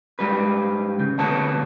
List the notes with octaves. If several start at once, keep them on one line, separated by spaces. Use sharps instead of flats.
G#2 G3 B4
C#3
D2 B2 B4 C#5 A5